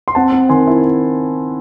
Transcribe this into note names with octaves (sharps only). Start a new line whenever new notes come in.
C6
C4 F#5 A5
C4
D#3 G#5 C6
E4